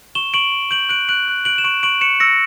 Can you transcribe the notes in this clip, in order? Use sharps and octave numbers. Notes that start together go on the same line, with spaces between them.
C#6 E7 G7
C#6 D7 F#7
C#6
G6 D7 F#7
F#6 D7 F#7
F#6 D7 F#7
F#6
F#6 D7 F#7
E7
C#6 D7 F#7
C#6 D7 F#7
C#6 C#7 E7
E6 A#6 C#7